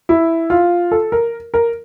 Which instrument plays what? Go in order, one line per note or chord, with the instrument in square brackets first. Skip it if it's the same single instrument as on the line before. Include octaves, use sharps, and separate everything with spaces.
[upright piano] E4
F4
A4
A#4
A#4